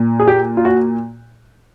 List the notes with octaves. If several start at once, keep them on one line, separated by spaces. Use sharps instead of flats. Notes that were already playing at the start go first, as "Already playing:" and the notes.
Already playing: A#2
G#4
G4
F4
F#4